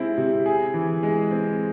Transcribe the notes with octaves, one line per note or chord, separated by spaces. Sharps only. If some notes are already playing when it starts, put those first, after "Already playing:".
Already playing: C3 G#3 C4 E4
C3
G#4
E3
G#3
C4